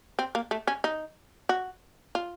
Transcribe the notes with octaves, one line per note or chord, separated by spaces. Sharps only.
C4
A#3
A3
C#4
D#4
F#4
F4